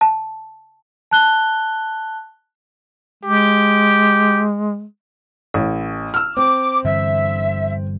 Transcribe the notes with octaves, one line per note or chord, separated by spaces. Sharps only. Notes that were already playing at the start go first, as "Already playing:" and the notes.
A5
A5 F#6 G7
G#3 G4
A1
E6 F6
C4 D6
G2 D3 E3 E5